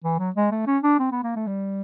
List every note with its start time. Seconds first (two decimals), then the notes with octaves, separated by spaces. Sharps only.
0.04 E3
0.19 F#3
0.36 G#3
0.52 A3
0.67 C#4
0.83 D4
0.99 C4
1.12 B3
1.24 A#3
1.36 A3
1.47 G3